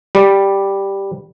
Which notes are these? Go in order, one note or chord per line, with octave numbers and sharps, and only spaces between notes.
G3